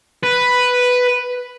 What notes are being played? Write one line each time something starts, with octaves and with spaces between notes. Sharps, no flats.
B4